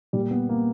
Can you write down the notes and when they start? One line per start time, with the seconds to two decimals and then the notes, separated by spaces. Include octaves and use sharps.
0.13 A#2 G3
0.31 B3
0.49 A#3